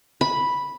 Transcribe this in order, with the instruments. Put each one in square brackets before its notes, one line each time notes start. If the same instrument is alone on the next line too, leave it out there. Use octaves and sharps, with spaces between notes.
[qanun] B5